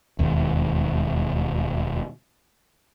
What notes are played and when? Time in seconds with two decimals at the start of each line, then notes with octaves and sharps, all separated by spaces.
0.19 E1 D#2